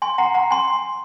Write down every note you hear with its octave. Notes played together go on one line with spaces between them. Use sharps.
G#5 C6
F#5 A#5
F#5 A#5
G#5 C6